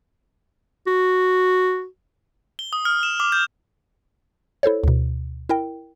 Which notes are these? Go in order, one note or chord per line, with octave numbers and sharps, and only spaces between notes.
F#4
G7
D#6
F6
E7
D6
G6
E4 A4 C5 C#5
D2 B2
E4 A#4 G5